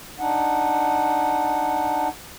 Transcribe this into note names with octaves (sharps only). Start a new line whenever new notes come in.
D4 D#4 F#5